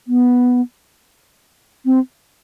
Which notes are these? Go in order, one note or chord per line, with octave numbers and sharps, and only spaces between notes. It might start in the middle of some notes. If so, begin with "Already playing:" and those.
B3
C4